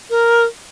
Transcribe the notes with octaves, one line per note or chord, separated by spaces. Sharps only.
A#4